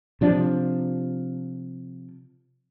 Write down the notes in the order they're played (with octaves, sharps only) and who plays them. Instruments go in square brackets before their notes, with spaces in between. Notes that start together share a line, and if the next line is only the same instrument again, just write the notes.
[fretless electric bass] C3 F3 D4